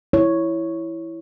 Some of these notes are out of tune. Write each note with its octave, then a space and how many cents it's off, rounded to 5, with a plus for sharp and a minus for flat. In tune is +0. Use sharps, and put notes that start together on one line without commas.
E4 +0 C#5 +0